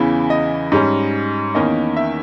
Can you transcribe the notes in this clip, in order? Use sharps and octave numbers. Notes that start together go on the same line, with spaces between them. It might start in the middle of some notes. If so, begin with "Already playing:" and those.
Already playing: E2 C#3 E3
D#5
G#2 G3 C#4
E2 D#3 A#3 C#4 D#5
E5